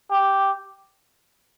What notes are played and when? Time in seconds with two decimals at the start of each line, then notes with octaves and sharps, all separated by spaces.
0.11 G4